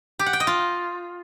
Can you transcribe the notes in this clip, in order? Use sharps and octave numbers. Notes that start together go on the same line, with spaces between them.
G4
F#5
G5
D#5
F4